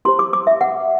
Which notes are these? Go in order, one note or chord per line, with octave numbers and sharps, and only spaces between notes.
E4 G4 C5 C6
D6
D6
E5
F#5